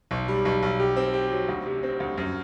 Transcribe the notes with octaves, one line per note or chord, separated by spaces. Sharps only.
B1
G3
B1
B1
G4
C4
G4
F#3
D2
C3
C4
D2
F#2